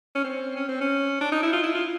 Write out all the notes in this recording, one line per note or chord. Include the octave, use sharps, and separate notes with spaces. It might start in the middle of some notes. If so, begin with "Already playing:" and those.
C#4
C4
C#4
C4
C#4
D4
D#4
E4
F4
E4
F4